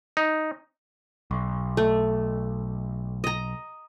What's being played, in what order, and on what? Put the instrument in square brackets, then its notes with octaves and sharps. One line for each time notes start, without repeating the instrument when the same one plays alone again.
[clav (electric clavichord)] D#4
[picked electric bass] B1
[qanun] A3
D#5 A#5